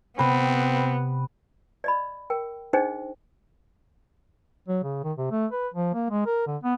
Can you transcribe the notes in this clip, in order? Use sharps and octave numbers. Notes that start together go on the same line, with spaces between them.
C3 B3 C4 B4
D5 D#5 B5
A#4 G5
D4 D#4 G#4 C5 D#5 G5
F#3
C#3
D#3
C3
A3
B4
F3
A#3
G#3
A#4
D3
B3